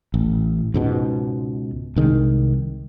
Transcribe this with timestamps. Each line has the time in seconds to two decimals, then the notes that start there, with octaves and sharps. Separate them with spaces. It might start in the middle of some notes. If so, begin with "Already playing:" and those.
0.14 A1
0.74 C#2 G#2 B2
1.96 C2 D#3 G#3